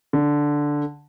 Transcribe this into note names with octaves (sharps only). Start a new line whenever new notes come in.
D3